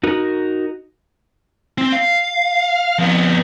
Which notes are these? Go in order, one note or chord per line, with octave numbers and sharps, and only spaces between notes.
D#4 F#4 A#4
C4
F5
F2 B3